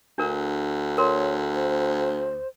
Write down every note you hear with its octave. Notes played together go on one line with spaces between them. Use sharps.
D2 D4 A#4
A#4 C#5 C6
C5